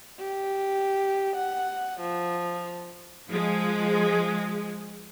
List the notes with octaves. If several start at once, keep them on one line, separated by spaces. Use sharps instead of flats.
G4
F#5
F3
F3 G#3